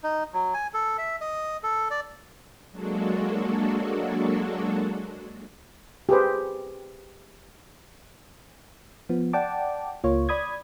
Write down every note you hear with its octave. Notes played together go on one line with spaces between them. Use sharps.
D#4
F#3
G#5
A4
E5
D#5
A4
D5
F#3 G#3 A#3 D4 F#4 A4
G4 G#4 B4 C5
F3 B3
D5 F#5 G5 A5 D6
C#2 A#3 F4 C#5
D5 B5 D#6 G#6